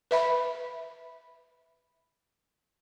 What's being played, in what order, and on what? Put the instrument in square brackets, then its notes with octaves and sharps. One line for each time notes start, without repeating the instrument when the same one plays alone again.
[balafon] B4 E5 B5